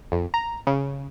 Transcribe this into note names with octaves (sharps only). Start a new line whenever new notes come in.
F2
A#5
C#3